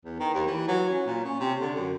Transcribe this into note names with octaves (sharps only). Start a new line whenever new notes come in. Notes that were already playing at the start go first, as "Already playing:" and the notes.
E2
D#3
D#2
E3
F#3
C#4
A#2
C#4
C3
D3
F#2